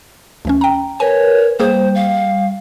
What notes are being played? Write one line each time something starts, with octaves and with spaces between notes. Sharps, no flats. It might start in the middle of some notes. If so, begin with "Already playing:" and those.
D2 E3 C#4
G5 A#5
A#4 B4 C#5 G#5
G3 A#3 G#4 C5
F5